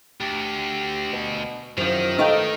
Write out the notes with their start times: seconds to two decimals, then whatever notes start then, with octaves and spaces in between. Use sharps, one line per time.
0.20 D2 G4
1.13 B2
1.78 F#2 C3 D#3 F3 E4
2.19 A3 D#4 B4 F5 G5